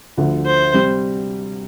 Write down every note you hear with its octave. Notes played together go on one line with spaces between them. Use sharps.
D2 D3 F3
C5
C3 G3